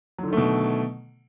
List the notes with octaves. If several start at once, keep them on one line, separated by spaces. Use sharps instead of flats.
B2 D3 D#3 F#3 A3